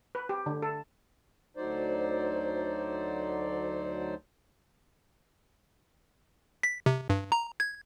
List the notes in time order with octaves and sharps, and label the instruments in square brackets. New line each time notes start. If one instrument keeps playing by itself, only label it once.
[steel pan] B4
G4
D3
A4
[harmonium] D2 F#3 D#4 C5 D5
[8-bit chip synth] B6
C3
G2
A#5
G#6